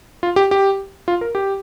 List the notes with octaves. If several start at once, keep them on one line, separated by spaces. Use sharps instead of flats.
F4
G4
G4
F4
A#4
G4